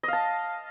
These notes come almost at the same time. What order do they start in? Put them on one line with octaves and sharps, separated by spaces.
D#5 F5 A5